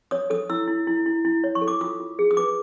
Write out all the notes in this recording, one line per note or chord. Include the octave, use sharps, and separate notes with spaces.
C#5 D#6
A4 D#6
E4 E6
E4
E4
E4
E4
C#5
C#6
A4
D6
F4 D#6
F4
G#4
D#6
B4 D6